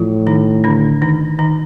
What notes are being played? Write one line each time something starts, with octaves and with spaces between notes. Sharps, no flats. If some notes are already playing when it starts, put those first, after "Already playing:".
Already playing: A2 F3 F4
D#3 D#4
D3 D4
D#3 D#4
D#3 D#4